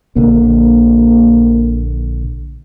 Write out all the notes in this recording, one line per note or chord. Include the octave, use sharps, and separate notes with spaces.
A#1 D3 A#3